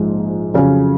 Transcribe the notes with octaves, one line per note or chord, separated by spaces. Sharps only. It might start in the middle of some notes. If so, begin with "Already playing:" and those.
Already playing: A#1 G#2 F3 G#3 D#4
F2 C#3 F#3 C#4